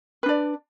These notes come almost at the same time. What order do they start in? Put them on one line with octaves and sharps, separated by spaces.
B4 D4 D5